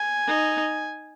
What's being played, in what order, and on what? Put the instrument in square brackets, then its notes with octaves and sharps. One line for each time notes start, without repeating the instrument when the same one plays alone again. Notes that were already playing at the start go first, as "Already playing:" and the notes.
Already playing: [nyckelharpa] G#5
[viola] D#4